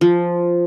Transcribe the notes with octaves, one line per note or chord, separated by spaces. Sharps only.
F3